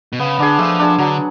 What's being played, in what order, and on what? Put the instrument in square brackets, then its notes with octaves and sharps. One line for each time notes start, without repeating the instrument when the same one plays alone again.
[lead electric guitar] B2
[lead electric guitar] C#3 [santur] B3
[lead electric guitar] D3 [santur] D4 G#4
[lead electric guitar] F3 [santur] A3
[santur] D4 G#4
[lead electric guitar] D3 [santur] F#3